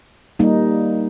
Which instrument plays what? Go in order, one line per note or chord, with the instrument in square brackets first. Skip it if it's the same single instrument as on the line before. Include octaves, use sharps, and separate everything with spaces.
[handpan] G3 A#3 D#4